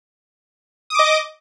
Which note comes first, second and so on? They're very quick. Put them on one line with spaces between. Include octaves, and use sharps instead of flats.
D#6 D6 D#5